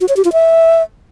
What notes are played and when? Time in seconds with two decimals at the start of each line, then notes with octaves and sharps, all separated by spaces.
0.01 F#4
0.09 C#5
0.17 G4
0.25 F4
0.33 E5